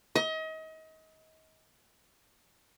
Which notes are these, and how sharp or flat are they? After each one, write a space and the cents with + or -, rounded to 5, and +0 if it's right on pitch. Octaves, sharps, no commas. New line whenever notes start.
D#5 +35